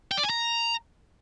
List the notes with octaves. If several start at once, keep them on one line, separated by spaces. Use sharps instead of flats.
G5
D5
G#5
A#5